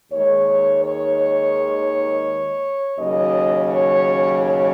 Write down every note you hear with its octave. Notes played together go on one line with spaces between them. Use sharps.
D#2 D#3 G#3 C#5
C#5
D#2 C#3 F#3 D#5
C#5
C#5